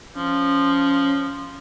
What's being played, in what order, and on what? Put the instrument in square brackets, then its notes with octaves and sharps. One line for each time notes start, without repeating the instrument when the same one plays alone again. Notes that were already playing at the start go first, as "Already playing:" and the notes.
[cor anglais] F3 [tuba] C#4